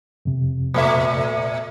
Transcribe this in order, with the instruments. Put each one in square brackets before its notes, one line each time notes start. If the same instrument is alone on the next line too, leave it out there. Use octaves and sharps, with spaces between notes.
[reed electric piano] F2 C3
[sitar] A#2 A3 E5